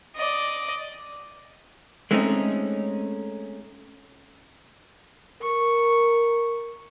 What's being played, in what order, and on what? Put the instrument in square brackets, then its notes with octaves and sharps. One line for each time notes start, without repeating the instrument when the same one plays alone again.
[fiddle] D5 D#5
[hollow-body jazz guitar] G#3 A3 C4 C#4 D#4
[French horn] A#4 [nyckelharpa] C#6